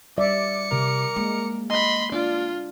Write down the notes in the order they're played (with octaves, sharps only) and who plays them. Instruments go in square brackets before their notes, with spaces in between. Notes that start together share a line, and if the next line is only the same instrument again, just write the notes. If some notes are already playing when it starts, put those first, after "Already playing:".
[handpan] G3 D5 E5 [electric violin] D6 C#7
[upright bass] C3 [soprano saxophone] A#4
[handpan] G#3 [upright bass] A#3
[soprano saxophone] D#5 [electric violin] B5 C6
[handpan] D4 [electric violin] F4 [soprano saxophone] D5